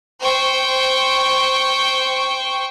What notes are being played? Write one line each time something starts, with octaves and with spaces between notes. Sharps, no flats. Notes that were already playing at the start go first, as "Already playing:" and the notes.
C5 G5 C#6